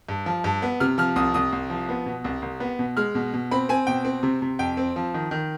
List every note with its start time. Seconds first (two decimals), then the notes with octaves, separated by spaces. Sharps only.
0.09 G2
0.26 F3
0.44 G2
0.62 B3
0.80 C3 F6
0.98 F3 F6
1.16 C2 D#6
1.34 C2 D#6
1.52 C2
1.70 F3
1.89 B3
2.06 B2
2.24 C2
2.42 C2
2.60 B3
2.79 B2
2.97 G#3 F6
3.15 B2
3.33 B2
3.51 C4 B5
3.69 C4 G#5
3.87 B2 G5
4.05 C4
4.23 C3
4.42 C3
4.59 F2 G5
4.77 C4
4.96 F3
5.14 D#3
5.31 D#3